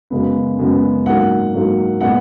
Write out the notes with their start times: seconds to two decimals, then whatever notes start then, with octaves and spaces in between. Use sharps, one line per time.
0.10 F#2 C#3 G#3 B3
0.59 F#2 C#3 G#3 B3
1.06 G#2 F#3 A#3 F#5
1.54 G#2 F#3 A#3
2.01 A#2 G#3 B3 F#5